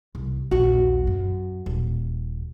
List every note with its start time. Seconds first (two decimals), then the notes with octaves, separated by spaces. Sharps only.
0.15 C2
0.51 A#1 D#2 F#4
1.07 F#2
1.66 D#1